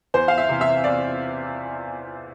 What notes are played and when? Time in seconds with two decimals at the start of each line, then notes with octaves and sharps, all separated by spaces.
0.14 E2 C5
0.28 F5
0.38 E5
0.49 C3 E3
0.61 E5
0.84 E2 D5